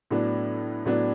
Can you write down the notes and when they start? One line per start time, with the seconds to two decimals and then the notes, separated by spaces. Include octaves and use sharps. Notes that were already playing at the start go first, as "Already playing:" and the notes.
0.11 A2 F#3 B3 D4
0.85 A2 F#3 B3 D4